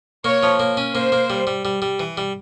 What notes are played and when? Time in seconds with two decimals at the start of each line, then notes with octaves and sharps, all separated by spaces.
0.25 A#3 C#5
0.43 F3
0.60 A#3
0.77 C#4
0.95 A#3 C5
1.12 A#3
1.30 G3
1.47 G3
1.65 G3
1.82 G3
2.00 E3
2.17 G3